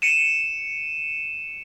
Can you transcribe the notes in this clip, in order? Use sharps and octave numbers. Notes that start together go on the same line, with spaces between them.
C#7 D#7 E7